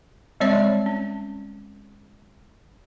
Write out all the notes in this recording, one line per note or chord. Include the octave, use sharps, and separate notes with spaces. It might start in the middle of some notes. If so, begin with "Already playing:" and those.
G3 G#3 C4 C#5 D5 E5
C#4